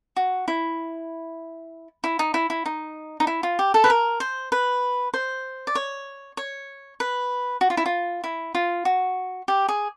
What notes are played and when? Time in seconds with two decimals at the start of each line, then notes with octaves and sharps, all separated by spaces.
0.16 F#4
0.48 E4
2.04 E4
2.19 D#4
2.34 E4
2.50 E4
2.66 D#4
3.20 D#4
3.27 E4
3.43 F4
3.59 G4
3.74 A4
3.84 B4
3.90 A#4
4.20 C5
4.52 B4
5.14 C5
5.67 D5
5.75 C#5
6.37 C#5
7.00 B4
7.61 F#4
7.70 F4
7.77 E4
7.86 F4
8.24 E4
8.55 F4
8.85 F#4
9.48 G4
9.68 G#4